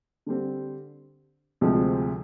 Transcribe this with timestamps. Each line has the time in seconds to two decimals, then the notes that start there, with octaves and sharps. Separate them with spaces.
0.26 D3 G3 C4
1.61 D2 C3 F3 G#3 C4